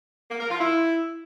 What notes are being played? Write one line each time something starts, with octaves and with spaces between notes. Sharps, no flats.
A#3
A#4
F4
E4